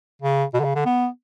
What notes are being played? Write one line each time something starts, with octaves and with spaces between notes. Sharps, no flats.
C#3
B2
D3
C#3
D3
B3